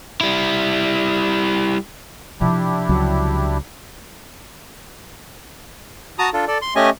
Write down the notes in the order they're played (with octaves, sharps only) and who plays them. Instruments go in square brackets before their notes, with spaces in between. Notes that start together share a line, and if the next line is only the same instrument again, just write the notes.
[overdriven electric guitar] G3 E4
[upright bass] C3 F3 [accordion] D4 E4 G4
[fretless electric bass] C#2 F#3
[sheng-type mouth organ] F#4 A5 A#5 D#6
D4 F4 A4
A4 D5
C6
A3 C#4 G4 D#5 G#5